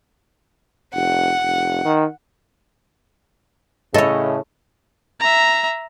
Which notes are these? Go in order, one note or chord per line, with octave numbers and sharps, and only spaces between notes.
F1 F#5
F1
D#3
A2 C#3 A4 C#5 D#5
E5 A#5